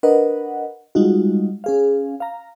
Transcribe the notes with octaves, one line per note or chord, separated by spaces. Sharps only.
D4 A#4 B4 D#5 F#5
G3 G#3 D#4 F4 F#4
C#4 G#4 F5
F5 A#5